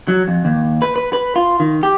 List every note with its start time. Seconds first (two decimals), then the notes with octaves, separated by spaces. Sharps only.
0.08 F#3
0.28 F2
0.45 D#2
0.82 B4
0.96 B4
1.13 B4
1.36 F4
1.60 D#3
1.83 G4